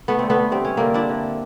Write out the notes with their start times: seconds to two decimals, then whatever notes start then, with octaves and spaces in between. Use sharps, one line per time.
0.08 A3 B3
0.19 D3 C4
0.30 A3 B3
0.51 G2 C4
0.65 C#4
0.77 D3 A#3 C4
0.94 D4 E4
1.09 D3